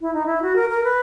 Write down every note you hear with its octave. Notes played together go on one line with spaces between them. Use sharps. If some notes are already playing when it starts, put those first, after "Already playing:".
E4
D#4
E4
F#4
A#4
A#4
B4